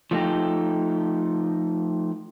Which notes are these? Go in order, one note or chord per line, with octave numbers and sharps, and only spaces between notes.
F3 A3 D#4 G4